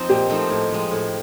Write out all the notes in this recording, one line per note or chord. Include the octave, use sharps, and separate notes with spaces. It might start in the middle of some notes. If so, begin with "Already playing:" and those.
Already playing: F3 C4 D#4
A#2 G4
F3 A3 C4 D#4
A2
F3 G#3
A2